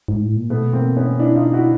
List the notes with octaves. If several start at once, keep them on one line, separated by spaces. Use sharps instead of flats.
G#2
A2
A#2
B2 A3 B3
A#3 C4
B3 C#4
D4 E4
D#4 F4
E4 F#4